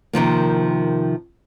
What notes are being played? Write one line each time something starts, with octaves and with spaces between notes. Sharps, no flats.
C3 D#3 F3 A#3